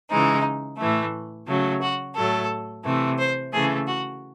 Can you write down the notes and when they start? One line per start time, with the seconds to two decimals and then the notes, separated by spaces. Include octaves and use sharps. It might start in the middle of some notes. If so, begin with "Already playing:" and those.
0.10 C#3 E3 G#3 D#4
0.79 A2 E3 A3
1.48 C#3 F#3 A3
1.81 F#4
2.15 A2 F#3 A3 A4
2.84 C3 E3 A3
3.18 C5
3.52 C#3 E3 A3 G#4
3.87 F#4